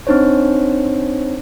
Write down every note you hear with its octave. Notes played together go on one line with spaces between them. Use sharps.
C4 D4 D#4 C5 C#5